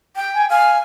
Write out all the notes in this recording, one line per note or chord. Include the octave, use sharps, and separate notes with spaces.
G5
G#5
F5 G#5